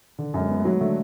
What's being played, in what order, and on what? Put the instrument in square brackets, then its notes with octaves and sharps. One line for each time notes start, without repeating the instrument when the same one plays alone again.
[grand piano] D3
[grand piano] F#2 [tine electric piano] G#3
[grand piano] B3
[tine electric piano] A3
[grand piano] F#3
[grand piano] D3 [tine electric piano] A3